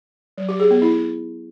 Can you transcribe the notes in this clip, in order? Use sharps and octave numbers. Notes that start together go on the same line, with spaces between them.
F#3
G4
G#4
B3
E4